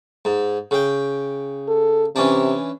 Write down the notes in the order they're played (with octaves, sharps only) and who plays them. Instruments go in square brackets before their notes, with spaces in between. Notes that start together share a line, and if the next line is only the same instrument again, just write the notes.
[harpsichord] G#2
C#3 G5
[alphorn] A4
[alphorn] C3 [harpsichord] E3 C#4 D4